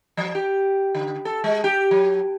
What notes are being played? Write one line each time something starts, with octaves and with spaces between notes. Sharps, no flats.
F3
G4
D3
A4
G#3
G4
F#3